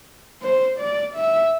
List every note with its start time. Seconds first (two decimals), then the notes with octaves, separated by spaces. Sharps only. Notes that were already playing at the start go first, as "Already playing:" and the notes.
0.42 C5
0.79 D5
1.15 E5